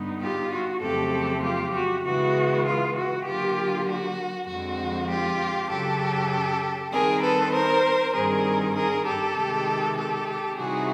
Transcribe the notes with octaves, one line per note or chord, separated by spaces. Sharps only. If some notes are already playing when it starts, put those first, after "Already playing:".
Already playing: G2 D3 G3 B3 D#4
F4 G4
F#4
F2 C#3 F#3 A3 C4 G4 A4
F4 G4
F#4
C#3 E3 G#3 B3 F#4
F4
F#4
D3 F#3 A#3 F4 G4
F#4
F2 D3 F3 G#3 C4 F#4
F4 G4
F#2 C#3 F#3 G4 A4
D#3 G3 C4 D#4 G#4 A#4
A4 B4
A#4 C5
G2 D#3 G3 C4 G#4 A#4
G#4 A#4
G4 A4
C3 D#3 G#3
G4 A4
C3 E3 G3 C4 D#4 F#4 G#4